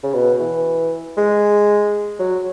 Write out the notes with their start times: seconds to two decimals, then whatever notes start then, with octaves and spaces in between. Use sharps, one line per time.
0.04 C#3
0.14 B2
0.40 E3
1.17 G#3
2.20 F#3